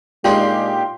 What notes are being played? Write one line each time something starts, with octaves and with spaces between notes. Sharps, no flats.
A#2 G#3 D4 D#4 F4 G4 F5 C6